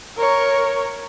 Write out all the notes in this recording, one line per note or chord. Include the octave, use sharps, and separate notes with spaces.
A#4 C#5